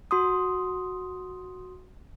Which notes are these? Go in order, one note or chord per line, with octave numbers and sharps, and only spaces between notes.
F#4 C6 D#6